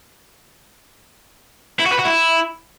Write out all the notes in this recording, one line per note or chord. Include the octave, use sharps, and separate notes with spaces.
E4
F#4
B4
F#4
E4